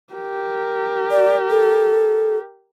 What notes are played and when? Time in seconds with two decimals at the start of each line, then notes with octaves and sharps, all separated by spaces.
0.13 G4 A#4
1.11 D5
1.50 A4